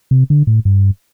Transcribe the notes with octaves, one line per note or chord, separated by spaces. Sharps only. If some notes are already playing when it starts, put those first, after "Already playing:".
C3
D3
A2
G2